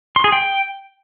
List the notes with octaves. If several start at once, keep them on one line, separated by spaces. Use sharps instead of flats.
C6
G#4
G5